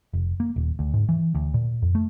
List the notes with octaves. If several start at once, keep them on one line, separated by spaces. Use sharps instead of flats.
F1
A#3
D#1
D2
G#2
E3
D2
A#2
F2
A3